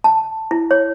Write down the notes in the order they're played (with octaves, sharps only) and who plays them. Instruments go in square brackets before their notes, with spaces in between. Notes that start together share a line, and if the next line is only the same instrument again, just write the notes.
[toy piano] A5
E4
C#5